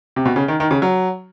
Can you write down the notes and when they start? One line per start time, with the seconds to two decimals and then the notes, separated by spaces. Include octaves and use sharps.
0.16 C3
0.26 B2
0.36 C#3
0.48 D#3
0.60 D#3
0.71 C#3
0.82 F#3